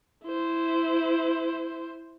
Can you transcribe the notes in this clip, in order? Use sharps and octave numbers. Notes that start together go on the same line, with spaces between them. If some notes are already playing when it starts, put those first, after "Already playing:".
E4 C5